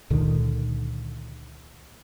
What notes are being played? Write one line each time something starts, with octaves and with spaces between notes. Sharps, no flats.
C#2 A#2 D3 D#3